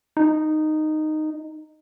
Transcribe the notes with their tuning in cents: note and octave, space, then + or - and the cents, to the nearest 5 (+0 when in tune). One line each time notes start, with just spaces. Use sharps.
D#4 -10